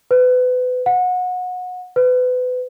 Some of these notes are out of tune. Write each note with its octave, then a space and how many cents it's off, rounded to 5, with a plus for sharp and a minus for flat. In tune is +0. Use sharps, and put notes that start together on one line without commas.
B4 +30
F#5 -25
B4 +30